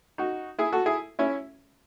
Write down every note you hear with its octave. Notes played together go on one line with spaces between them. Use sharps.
D#4 F#4
E4 G#4
F#4 A4
E4 G#4
C#4 E4